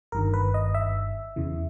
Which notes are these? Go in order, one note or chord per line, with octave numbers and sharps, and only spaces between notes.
G1 G2 D#3 A#4
B4
D#5
E5
E2 C#3 E3